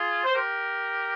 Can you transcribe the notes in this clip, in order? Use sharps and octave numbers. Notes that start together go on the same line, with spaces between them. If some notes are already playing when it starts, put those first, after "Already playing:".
Already playing: F4 G#4
C5
G4 A#4